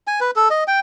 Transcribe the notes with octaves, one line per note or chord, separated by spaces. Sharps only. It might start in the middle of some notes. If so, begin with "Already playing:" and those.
G#5
B4
A4
D#5
G5